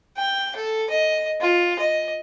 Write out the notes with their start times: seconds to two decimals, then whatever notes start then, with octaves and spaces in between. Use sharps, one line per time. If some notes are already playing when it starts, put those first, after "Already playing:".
0.17 G5
0.55 A4
0.90 D#5
1.41 F4
1.79 D#5